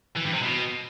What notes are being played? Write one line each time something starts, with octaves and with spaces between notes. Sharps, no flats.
E3
G2
C3
B2